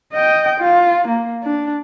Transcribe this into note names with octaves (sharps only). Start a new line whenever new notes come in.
D#5 G5
F4
A#3
D4